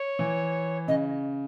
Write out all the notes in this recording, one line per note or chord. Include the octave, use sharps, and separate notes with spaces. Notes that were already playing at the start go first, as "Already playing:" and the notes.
Already playing: C#5
E3
C#3 D#5